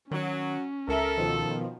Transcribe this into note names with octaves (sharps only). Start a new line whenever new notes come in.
D#3 F#3 C#4
C#2 A4 A#4 E5
B2 D#3 F3